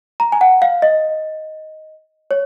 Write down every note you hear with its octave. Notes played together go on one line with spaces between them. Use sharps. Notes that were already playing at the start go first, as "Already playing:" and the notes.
A#5
G#5
F#5
F5
D#5
C#5